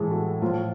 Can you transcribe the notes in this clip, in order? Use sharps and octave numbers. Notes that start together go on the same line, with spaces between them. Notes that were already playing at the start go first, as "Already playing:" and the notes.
Already playing: A2 E3 G#3 A3 G#4 A4
F#4
A2 F3 F4